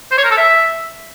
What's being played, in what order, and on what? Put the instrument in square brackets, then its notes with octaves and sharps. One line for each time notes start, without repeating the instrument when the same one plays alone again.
[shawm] C5
C#5
A#4
A4
E5